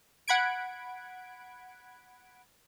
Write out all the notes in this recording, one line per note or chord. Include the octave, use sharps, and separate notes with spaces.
F#5 B5 G#6 D7